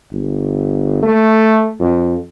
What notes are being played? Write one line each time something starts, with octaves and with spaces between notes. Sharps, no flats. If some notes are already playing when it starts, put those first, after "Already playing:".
G1
A3
F2